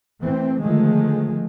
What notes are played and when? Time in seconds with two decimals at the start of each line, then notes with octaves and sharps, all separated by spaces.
0.19 E3 A3 C4
0.61 D3 D#3 F3 G#3 A3